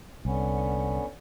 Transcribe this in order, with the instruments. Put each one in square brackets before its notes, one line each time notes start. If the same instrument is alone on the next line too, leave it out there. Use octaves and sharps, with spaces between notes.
[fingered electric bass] C2 [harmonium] D3 B3 C#4